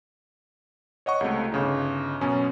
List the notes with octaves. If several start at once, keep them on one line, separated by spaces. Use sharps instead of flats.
C#5 D#5 F#5 C#6
C#2 C3 A3
G1 C#3 D#4
F#2 B2 C#4